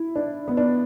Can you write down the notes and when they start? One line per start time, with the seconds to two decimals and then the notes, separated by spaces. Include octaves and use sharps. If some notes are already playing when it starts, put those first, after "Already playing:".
Already playing: E4
0.16 D4
0.48 B3
0.57 D4